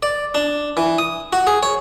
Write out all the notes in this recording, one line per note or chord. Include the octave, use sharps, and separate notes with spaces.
D5
D4
E3
D#6
F#4
G#4
C#5